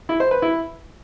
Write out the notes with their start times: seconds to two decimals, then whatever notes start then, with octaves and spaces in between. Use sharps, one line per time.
0.09 E4
0.20 C5
0.31 B4
0.42 E4